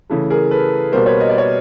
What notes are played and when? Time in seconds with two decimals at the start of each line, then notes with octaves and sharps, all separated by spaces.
0.10 C#3 E3 A3
0.30 G#4 A#4
0.51 A4 B4
0.92 B2 G3 A#3 A#4 C5
1.06 B4 C#5
1.20 D#5
1.29 D5
1.38 C#5